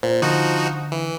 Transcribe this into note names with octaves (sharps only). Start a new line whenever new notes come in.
A#2 C5
D3 F3 D#4 F#4
E3